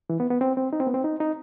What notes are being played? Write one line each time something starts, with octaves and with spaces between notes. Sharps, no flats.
E3
B3
B3
C4
C4
D#4
C4
B3
C4
D#4
D#4